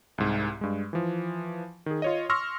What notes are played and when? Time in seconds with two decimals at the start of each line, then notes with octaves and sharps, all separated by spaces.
0.18 C2 G#2
0.61 G2 G#3
0.93 E3 F3
1.86 D#3 G#4
2.02 F4 C#5 D#5
2.30 C6 C#6 E6 F6 A#6